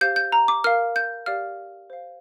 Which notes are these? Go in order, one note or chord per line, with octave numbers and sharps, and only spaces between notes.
G4 C5 F5 G6
G6
A#5
D6
A#4 F5 F6
G6
G4 D5 F5 F6
C5 F5